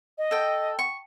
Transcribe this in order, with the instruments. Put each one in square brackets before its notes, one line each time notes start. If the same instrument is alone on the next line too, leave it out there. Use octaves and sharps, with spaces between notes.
[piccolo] D#5
[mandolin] A4 G5
C#6